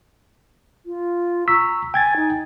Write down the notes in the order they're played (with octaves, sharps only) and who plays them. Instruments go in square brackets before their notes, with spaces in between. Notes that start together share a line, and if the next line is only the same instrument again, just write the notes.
[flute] F4
[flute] A#5 [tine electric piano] C#6 E6 B6
[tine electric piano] G5 G#6 A6 [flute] G#5
[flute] D#4